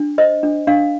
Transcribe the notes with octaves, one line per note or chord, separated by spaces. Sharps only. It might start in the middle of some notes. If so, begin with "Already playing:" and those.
Already playing: D4
C5 D#5
D4
D4 F5